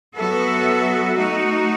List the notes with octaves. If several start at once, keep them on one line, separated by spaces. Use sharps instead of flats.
F#3 B3 F#4 A4 E5
A3 D#4 F#4